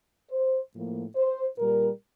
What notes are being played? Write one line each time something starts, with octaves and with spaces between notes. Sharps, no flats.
C5
A2 F3 A#3
C5
A#2 G3 A#3 A#4